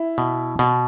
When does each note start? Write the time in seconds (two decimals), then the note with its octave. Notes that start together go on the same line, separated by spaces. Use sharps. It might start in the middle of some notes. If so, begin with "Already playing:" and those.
Already playing: E4
0.18 B2
0.59 B2